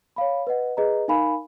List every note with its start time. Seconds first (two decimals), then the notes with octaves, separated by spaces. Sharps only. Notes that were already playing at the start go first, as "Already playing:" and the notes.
0.16 C#5 F5 B5
0.47 B4 D#5 F#5
0.77 G#4 B4 D#5 A#5
1.08 D#4 A#4 F5 G#5 B5